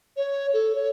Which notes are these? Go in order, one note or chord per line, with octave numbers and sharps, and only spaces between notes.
C#5
A4
C#5